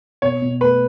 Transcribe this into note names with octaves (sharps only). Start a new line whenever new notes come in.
B2 C#5
B2
A3 B4